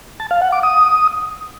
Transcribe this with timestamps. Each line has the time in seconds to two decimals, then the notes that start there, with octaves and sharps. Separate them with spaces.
0.20 A5
0.31 F5
0.42 F#5
0.52 D6
0.63 D#6